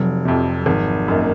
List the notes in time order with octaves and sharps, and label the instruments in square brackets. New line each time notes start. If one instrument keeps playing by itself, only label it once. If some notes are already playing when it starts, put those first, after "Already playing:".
Already playing: [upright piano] F1 [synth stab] F3 F#3
[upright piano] F2 C3
G#1
F#2 D#3 A#3